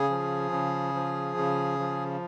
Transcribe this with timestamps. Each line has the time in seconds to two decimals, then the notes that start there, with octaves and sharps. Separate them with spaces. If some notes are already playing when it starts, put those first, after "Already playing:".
Already playing: C#3 G#4
0.09 F3
0.51 C#3
0.94 F3
1.37 C#3
1.79 F3